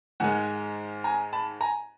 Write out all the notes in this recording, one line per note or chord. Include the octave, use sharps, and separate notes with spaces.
G#2 D#3 G#3 F#5 G#5
G#5 A#5
A5 B5
G#5 A#5